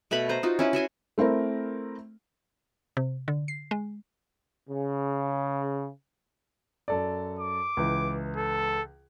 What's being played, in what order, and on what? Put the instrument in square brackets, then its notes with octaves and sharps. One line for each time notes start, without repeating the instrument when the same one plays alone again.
[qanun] B2 A3 B4 B5
B4 C5 A#5
D#4 F4 F#4
C#4 E4 B4
F#4 E5 G#5 C6
[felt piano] A3 C4 E4 A#4
[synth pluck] C3
D3
C7
G#3
[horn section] C#3
[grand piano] F#2 A4 D5
[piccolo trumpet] D6
[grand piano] C#2 E3
[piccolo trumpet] A4